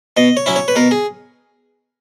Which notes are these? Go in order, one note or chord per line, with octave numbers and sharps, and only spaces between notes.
B2 D#5
C#5
F#3 C#4 E4
C#5
B4
B2 A#4
G#4